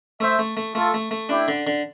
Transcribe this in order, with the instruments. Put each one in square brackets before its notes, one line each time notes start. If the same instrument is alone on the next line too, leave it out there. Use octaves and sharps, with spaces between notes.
[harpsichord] A3 [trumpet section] C5 E5
[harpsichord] A3
A3
[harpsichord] A3 [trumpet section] F4 A4
[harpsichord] A3
A3
[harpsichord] D4 [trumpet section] E4 G4
[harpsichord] D3
D3